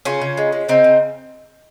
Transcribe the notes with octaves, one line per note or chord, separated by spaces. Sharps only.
C#3 C#4 F4
C#3
G#3
G#3
C#3 C4 D#4
C#3